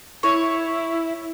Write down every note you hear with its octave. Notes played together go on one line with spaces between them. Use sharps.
E4 C#5